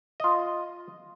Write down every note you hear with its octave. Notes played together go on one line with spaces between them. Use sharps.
F4 D#5